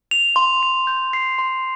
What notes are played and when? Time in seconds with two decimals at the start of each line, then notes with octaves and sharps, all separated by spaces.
0.11 F7
0.36 C6
0.63 F7
0.87 G6
1.13 C7
1.38 C6